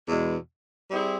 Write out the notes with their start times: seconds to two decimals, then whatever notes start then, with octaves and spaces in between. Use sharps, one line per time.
0.07 E2 B2 G#3
0.90 G3 C4 E4 G#4